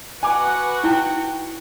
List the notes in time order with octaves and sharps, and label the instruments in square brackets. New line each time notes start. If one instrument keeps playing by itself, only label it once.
[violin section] F#4 B4 F#5 [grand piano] G#5 D6
[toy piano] D#4 E4 [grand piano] G5